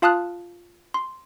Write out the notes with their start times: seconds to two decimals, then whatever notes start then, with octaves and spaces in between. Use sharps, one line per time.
0.02 F4 F5 A5 D#6 F6 F#6
0.94 C6